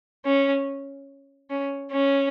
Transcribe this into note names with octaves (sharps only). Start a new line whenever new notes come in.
C#4
C#4
C#4